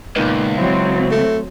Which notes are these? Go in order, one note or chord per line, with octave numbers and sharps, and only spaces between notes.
C#2 A#2 D#3 B3
F#3 C4 E4
A3